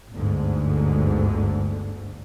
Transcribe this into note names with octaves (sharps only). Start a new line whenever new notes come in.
G1 D2 G#2 D3